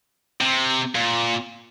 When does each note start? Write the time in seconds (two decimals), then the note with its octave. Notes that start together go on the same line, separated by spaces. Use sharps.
0.41 C3
0.95 A#2